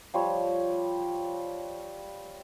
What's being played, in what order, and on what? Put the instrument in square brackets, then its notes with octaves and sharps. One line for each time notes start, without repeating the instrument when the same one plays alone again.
[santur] F3 G3 C#5